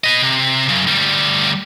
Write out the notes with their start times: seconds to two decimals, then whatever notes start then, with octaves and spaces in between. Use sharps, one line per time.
0.04 B4 D#5
0.22 C3
0.69 F#2 C#3
0.88 D2 G3